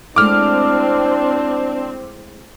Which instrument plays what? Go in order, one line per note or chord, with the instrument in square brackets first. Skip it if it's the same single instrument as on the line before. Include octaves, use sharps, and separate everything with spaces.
[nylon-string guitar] G#3 A3 E4 [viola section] C4 [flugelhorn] D4 [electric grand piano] D6 F6